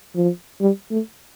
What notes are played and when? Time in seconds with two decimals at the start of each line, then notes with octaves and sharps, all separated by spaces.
0.15 F3
0.61 G3
0.91 A3